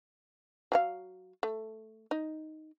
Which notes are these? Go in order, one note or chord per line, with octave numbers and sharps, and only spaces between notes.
F#3 G#4 F5
A3
D#4